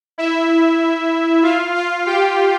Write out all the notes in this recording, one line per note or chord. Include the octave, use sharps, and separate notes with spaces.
E4 E5
F4 F5
F4 F5
G4 G5